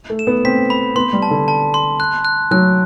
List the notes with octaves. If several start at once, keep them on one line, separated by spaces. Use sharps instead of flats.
A3
E7
B3
C4 B6
B5
B3 C6
G3
A5
D3
A5
C6
F#6
F#6
F#3 F#6